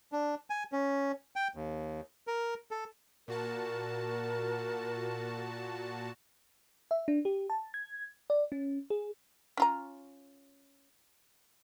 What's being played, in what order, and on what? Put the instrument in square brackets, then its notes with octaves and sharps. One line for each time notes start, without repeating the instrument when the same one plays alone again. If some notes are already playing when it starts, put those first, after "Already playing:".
[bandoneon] D4
G#5
C#4
G5
D#2
A#4
A4
[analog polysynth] A#2 F#4 A5 [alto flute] A#4
[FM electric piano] E5
D4
G4
A5
G#6
D5
C#4
G#4
[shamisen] C#4 F4 A#5